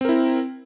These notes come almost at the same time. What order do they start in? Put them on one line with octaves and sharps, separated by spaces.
C4 A#4 E4